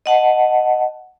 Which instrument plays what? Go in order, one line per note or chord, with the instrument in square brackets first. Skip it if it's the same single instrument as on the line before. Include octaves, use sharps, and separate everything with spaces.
[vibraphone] D#5 F#5 A5